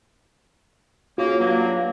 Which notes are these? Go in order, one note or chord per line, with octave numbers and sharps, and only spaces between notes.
C#3 A#3 F4 F#4
G2 F#3 A#3